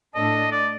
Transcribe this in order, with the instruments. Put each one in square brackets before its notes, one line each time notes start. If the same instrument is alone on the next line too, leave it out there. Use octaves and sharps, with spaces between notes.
[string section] A2 A3 D4 A4 [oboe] D#5
[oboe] D5